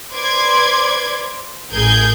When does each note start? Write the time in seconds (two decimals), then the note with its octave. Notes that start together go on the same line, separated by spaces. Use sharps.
0.12 B4 C5 D5 C6 D6 G#6
1.71 A1 G#4 A#4 G6 G#6